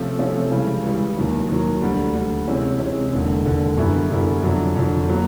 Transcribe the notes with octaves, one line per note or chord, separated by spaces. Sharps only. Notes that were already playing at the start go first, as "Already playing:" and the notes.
Already playing: C3 F3 A3 C#4
C3 F3 A3 C#4
C#2 C#3 E3 G3
C#2 C#3 E3 G3
D#2 D#3 F#3
D#2 D#3 F#3
D2 D3 G3
D2 D3 G3
C3 E3 G#3 C#4
C3 E3 G#3 C#4
E1 D#2 D3
E1 D#2 D3
F#2 D3 G3 B3 E4
F#2 D3 G3 B3 E4
F2 D3 F#3
F2 D3 F#3
A#2 F#3 B3